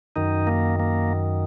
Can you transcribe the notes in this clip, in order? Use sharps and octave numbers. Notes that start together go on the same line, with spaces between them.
F#2 D#3 D#4
A#3
A#3